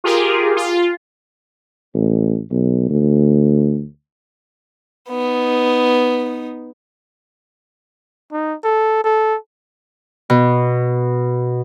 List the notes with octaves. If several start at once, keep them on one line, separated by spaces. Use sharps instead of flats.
F4 G4 G#4 A#4
F4
A1
B1
D2
B3 D#4
D#4
A4
A4
B2